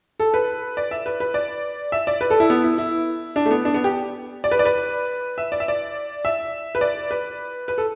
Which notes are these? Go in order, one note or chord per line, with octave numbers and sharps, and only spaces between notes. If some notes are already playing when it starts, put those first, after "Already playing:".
A4
B4
D5
E5
B4
B4
D5
E5
D5
B4
A4
E4
B3
E4
E4
D4
A3
B3
D4
B3
G4
D5
B4
D5
B4
E5
D5
E5
D5
E5
B4
D5
B4
B4
A4